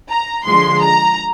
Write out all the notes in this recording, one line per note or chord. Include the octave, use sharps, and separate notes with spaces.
A#5
D3 F3 G#3 C6
A#5